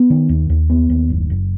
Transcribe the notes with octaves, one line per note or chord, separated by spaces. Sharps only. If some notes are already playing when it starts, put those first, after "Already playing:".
Already playing: B3
D#3
D#2
D#2
B3
D#2
F#1
F#1